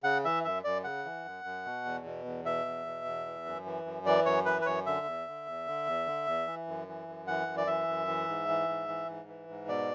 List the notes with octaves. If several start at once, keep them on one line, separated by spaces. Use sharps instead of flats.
C#3 F#5
E3 E5
F#2 E5
F#2 D5
C#3 F#5
E3
F#2
F#2
B2
E2
B2
E2
B2 E5
E2
B2
E2
E3
F#2
E3
F#2
E3 D5
F#2 C#5
E3 B4
B4
F#2 C#5
D3 E5
E2
D3
E2
D3
E2
D3
E2
E3
F#2
E3
F#2
E3 F#5
F#2
D5
E3 E5
F#2
E3
G#2
E3
G#2
E3
G#2
E3
G#2
B2 D5